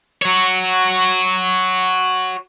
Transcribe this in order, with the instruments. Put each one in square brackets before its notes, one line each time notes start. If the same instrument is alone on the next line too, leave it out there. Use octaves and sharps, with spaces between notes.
[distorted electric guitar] F#4 C#5